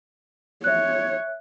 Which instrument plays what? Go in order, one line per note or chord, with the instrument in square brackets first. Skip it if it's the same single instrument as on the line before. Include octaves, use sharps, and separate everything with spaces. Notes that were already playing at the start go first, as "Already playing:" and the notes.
[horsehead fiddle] C#5 [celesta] E5 F#6